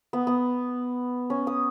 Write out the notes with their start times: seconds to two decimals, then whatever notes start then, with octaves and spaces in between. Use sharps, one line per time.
0.13 B3
0.27 B3
1.30 C#4
1.47 D#6